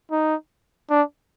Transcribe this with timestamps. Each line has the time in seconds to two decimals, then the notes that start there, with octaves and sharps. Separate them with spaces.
0.12 D#4
0.90 D4